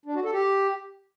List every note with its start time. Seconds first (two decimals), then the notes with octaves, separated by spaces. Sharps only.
0.06 D4
0.15 F#4
0.24 A4
0.33 G4